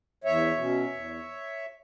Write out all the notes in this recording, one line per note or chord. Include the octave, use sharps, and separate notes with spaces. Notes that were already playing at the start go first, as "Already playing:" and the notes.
E2 C#5 E5
B2 F#3 C#4
E2